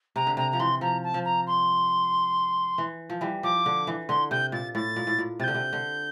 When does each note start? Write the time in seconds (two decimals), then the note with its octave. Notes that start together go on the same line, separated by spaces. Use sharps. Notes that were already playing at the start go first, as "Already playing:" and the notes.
0.16 C3 A#5
0.27 D3
0.37 C3 A#5
0.51 F3 A#5
0.59 E3 C6
0.81 F3 A#5
1.03 A5
1.14 F3
1.25 A#5
1.47 C6
2.78 E3
3.10 F3
3.21 E3 G3
3.43 F3 D6
3.66 D3
3.87 E3
4.09 D3 C6
4.31 C3 G6
4.52 A#2 A6
4.75 A2 A6
4.96 A#2
5.07 A2
5.19 A#2
5.40 C3 A6
5.44 D3 G6
5.54 C3
5.73 D3